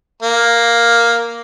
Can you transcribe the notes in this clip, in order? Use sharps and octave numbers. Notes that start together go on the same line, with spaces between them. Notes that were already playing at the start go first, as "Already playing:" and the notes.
A#3